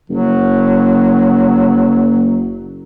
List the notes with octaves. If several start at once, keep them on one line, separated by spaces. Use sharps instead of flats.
F#1 F#3